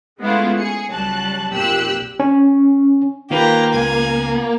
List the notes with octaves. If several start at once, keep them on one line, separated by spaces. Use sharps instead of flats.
G#3 A3 B3 C#4 E4 F4
G#4 C#7
C#2 F#3 G3 A5 F#6
B1 F2 A#2 G4 E6 F#6
C#4
D#3 A#3 F4 G4 B4 A#5
C#2 G#5